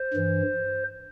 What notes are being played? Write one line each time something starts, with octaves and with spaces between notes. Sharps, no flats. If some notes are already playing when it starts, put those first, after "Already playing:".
Already playing: C5
G2 E3